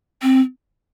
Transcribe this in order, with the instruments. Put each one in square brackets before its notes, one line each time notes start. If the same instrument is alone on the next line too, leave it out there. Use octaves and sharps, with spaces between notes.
[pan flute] C4